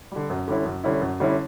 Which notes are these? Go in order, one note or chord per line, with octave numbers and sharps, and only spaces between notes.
D3 G3
F#2
D3 G3 C#4 E4
F#2
D3 G3 C#4 E4
F#2
D3 G3 C#4 E4